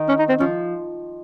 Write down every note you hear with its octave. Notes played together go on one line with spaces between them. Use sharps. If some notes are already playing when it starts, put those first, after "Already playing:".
Already playing: D#3
C#4
D#4
C4
F3 C#4